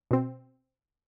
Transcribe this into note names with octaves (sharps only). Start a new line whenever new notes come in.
B2 C4